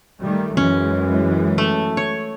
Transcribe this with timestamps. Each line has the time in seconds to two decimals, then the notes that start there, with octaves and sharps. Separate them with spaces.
0.22 D#3 G3 A3
0.57 F#2 E3 G#3 C#4
1.58 A3
1.97 C#5